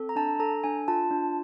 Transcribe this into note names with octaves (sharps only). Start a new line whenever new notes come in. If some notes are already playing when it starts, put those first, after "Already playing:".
Already playing: C4 A4
A#5
D4 A5
A4 A#5
D4 G#5
F4 A5
D4